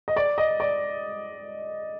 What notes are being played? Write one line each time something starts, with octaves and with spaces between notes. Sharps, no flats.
D#5
D5
D#5
D5